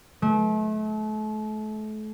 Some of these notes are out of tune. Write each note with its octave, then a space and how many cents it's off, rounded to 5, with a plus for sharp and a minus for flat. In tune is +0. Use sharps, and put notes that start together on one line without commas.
A3 -35